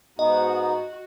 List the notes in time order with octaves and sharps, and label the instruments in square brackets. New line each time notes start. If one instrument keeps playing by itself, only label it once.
[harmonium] G#2 B3 D#4 [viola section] F#4 [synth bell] D#5